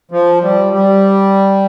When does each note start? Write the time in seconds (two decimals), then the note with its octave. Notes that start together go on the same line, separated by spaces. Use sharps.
0.11 F3
0.43 G3
0.73 G3